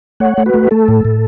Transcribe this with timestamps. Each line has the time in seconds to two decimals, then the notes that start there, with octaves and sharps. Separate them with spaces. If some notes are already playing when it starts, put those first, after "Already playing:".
0.20 A3 C#5 F#5
0.38 A3
0.46 F#4 B4
0.54 A3
0.71 A3 A4
0.88 A2
1.05 A2